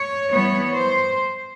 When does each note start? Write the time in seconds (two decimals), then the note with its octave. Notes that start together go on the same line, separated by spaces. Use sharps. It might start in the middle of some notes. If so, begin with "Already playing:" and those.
Already playing: C#5
0.30 E3 G3 B3 C#5
0.75 C5